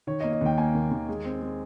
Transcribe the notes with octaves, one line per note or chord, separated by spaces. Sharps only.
D#3 C#5
D#5
A#3
D#5
D#2 G5
A#3 G#5
D#2
D#2
G#3
C4
G#3